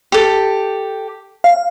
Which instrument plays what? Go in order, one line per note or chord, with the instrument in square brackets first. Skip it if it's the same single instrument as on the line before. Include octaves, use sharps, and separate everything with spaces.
[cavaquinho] G4 A4
[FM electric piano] F5